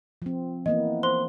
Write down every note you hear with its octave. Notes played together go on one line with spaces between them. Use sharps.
F3 C4
E3 A#3 B3 D#5
C5 C6 G7